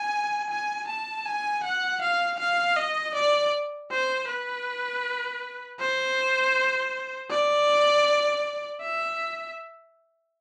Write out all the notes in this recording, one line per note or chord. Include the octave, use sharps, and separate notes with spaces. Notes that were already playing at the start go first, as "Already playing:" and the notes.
Already playing: G#5
G#5
A5
G#5
F#5
F5
F5
D#5
D5
C5
B4
C5
D5
E5